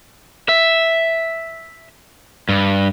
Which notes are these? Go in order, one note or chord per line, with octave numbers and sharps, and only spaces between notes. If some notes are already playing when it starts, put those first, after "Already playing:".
E5
G2